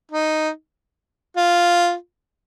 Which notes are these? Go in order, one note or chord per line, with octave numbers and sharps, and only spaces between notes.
D#4
F4